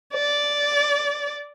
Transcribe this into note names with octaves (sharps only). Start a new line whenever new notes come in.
D5